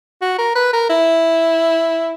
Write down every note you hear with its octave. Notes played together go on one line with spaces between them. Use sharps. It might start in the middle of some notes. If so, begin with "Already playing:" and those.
F#4
A#4
B4
A#4
E4